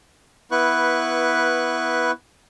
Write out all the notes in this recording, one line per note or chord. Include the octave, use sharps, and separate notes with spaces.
B3 E4 B4 C#6 F#6